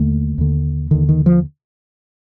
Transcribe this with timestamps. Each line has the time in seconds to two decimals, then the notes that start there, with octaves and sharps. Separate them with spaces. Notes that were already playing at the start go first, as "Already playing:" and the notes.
Already playing: D#2 D3 A3
0.38 D#2 D3
0.91 D#2 D3 D#3
1.09 D#3
1.26 F3